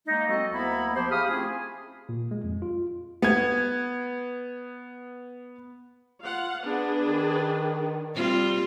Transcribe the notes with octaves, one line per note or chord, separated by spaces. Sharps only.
G#3 A#3 D#4
F#3 C4 F#4 A4 D#5
D2 A#3 B3 E4 E5 B5
F3 G4 C5
G4 G#4 F5 B5 D#6 F6
A3 C4 C#4 E4 F4 G#4
A#2
G#3
F2
F4
B3 G#6
F4 F5 F#5
B3 D4 G#4 B4
D#3
G3 C4 F4